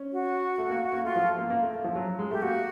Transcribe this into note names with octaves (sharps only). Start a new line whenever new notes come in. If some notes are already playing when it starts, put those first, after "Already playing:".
Already playing: C#4
F#4
A3
A#3
A#3
A3 F4
F3
A3
A#3
A#3
A3
A3
F3
F#3
G#3
A3 G4
A#3 F#4